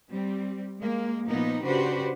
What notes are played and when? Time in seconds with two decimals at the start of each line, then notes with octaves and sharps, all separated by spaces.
0.11 G3 C4
0.78 G#3 A#3
1.26 A#2 F3 A#3 B3 D#4
1.64 C#3 D4 F#4 G4 B4 C5